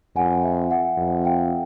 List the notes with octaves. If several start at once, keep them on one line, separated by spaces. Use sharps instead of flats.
F2 F#5 G#5
E5 F#5
E5 F#5
F2
F5 G5